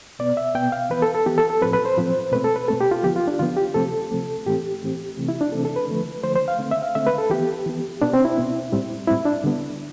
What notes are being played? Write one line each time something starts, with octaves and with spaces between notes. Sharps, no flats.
B2 B3 D5
E5
B2 B3 G5
F5
E3 B3 B4
A4
A4
E3 B3 G4
A4
A4
A2 F3 C4 B4
B4
C5
A2 F3 C4
B2 A3 C4 B4
A4
B4
B2 A3 C4 A4
G4
F4
D3 F3 B3 G4
F4
D4
D3 F3 B3 F4
G4
C3 F3 A3 C4 A4
C3 F3 A3 C4
A2 E3 A3 C4 G4
A2 E3 A3 C4
C3 E3 A3 C4
E4
D4
C3 E3 A3 C4 A4
A4
B4
D3 F3 A3
D3 F3 A3 C5
C5
F5
D3 A3 C4
E5
F5
D3 A3 C4 E5
B4
A4
E3 B3 G4
E3 B3
B2 B3 D4
C4
E4
B2 B3
A2 G3 C4
A2 G3 C4 E4
D4
D3 G3 B3